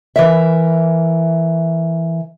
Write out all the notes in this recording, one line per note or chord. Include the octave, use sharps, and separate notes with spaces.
E3 A#4 E5